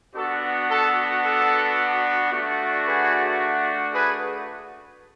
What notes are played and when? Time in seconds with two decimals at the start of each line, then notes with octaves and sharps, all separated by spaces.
0.14 B3 D4 F#4 A4
0.69 A4
1.24 A4
2.32 A3 D4 F#4
2.85 G#4 B4
3.94 G#4 B4